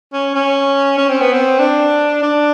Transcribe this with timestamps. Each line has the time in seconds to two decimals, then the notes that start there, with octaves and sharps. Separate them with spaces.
0.13 C#4
0.35 C#4
0.97 C#4
1.09 C4
1.21 B3
1.33 C4
1.59 D4
2.23 D4